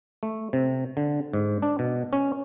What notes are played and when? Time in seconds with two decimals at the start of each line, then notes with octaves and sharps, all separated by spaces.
0.23 A3
0.53 C3
0.97 D3
1.34 G#2
1.62 D4
1.79 B2
2.13 C#4